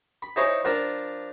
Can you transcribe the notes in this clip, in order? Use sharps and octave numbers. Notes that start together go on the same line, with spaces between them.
B5
D#4 E4 G#4 C5 C#5 D#5
F3 D4 F4 A#4